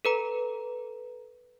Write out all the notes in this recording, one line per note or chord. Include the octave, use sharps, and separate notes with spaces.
A4 B4 A#5